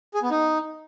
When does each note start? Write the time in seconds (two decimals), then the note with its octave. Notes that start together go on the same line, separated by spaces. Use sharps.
0.14 G#4
0.22 B3
0.31 D#4